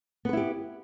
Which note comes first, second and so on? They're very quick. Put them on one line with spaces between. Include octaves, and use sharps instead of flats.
B3 B4 E4 G4